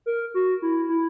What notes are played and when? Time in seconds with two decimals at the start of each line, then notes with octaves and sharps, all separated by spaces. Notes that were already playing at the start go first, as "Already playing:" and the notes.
0.06 A#4
0.34 F#4
0.62 E4
0.89 E4